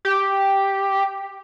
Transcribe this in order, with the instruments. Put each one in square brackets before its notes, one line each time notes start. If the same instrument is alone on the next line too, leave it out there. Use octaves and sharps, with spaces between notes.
[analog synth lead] G4